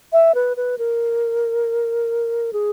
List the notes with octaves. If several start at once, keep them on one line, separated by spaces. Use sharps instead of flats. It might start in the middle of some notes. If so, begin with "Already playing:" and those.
E5
B4
B4
A#4
G#4